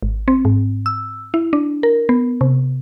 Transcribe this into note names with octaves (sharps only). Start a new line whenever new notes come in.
G#1
C4
G#2
E6
E4
D4
A#4
B3
C3